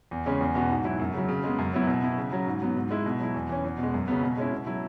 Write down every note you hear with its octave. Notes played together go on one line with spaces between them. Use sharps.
E2
C#3 G#3 C#4
E2
B2 B3 F#4
G#2
F#3 E4
F#2
C#3 F#3
C#3
G#3 B3
F#2
F#3 B3 E4
B2
B3 E4
C#3
F#3 C#4
G#2
F#3 B3
G#2
G#3 E4
B2
F#3 E4
E2
E3 C#4
E2
B2
G#3
F#2
C#3 F#3 B3
B2
G#3 C#4 E4
B2
F#3 E4